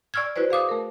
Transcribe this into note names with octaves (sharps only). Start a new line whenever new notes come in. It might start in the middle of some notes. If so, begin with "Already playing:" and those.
D5 C#6 E6 F6 G#6
E4 F#4 B4 C5 D5
G#4 F5 D6 D#6
A3 A#4